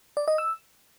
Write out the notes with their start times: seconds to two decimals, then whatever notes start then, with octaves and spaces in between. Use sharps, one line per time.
0.17 D5
0.28 D#5
0.38 E6